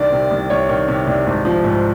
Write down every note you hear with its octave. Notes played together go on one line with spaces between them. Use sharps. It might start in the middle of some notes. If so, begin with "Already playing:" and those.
Already playing: C2 D#3 D5
C3
C2
C2 C#5
D#3
C3
C2
G#1
F3
G#2